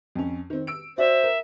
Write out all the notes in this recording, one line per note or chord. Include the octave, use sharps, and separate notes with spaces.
F2 C#4
D#3 C4
E6 D7
F#4 C5 D5 E5
A#4